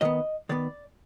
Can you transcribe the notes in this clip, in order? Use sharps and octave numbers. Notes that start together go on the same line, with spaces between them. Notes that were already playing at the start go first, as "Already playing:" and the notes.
D#3 B3 D#5
D#3 B3 D5